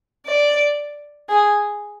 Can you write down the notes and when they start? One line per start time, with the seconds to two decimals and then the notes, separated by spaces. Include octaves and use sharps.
0.26 D5
1.29 G#4